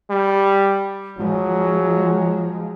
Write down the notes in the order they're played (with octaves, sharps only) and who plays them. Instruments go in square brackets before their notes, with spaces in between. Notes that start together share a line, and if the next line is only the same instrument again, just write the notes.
[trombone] G3
[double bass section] F3 G#3 [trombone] F#3